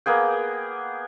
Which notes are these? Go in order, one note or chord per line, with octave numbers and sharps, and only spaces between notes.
A#3 B3 G#4 G5